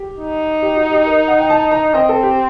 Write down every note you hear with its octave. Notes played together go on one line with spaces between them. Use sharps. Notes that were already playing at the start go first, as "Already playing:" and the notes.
Already playing: G4
D#4
G4
F#4
G4
A#4
F#5
G5
A5
A#5
C4 D#5
A4
G4